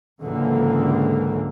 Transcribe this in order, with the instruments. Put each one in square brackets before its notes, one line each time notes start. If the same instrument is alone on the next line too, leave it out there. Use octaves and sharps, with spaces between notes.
[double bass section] C#2 G#2 D3 E3 F#3 A#3